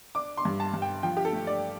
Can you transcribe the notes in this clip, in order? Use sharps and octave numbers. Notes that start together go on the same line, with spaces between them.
D4 D6
C6
G2
A5
G2
G5
F3 G5
G4
A4
A3
D5